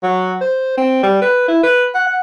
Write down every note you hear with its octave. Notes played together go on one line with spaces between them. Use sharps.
F#3
C5
C4
G3
B4
E4
B4
F#5
F#5